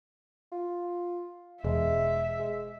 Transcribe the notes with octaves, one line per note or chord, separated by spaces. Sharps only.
F4
E1 G#3 E5
G#3